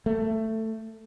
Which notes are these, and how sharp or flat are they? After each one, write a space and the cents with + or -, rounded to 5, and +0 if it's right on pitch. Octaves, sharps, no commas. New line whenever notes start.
A3 +10